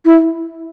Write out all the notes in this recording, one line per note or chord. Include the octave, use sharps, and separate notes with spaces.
E4